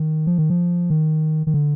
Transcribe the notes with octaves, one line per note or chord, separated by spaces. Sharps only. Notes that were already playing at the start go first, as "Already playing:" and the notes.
Already playing: D#3
F3
D#3
F3
D#3
D#3
D3